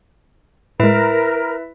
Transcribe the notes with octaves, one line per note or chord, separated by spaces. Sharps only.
A2 G#3 E4 A#4 B4 E5